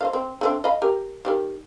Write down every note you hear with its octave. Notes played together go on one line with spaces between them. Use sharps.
C5 D#5 F5
C4
A3 C4 D4
D#5 F5 B5
G4 A#4
D#3 G3 G4